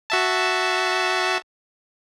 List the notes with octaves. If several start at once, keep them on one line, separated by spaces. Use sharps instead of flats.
F#4 E5 A5